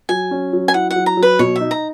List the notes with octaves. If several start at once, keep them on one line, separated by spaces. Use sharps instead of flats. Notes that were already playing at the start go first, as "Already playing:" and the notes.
F#3 G#5
C#4
F#3
G#5
E4 F#5
F#5
F#3
A#5
F#3
B4
B2 C#5
D#4 E5
A#5